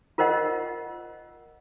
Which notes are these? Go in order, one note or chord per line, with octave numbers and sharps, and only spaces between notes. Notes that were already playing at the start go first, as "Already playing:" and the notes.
F4 A#4 C5 D#5 F#5